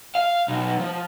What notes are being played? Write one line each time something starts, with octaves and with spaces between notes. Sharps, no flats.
F5
B1
F3